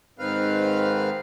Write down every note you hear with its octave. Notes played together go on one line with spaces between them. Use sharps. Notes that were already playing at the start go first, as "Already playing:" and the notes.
G#2 D#3 C4 B4 F5 F6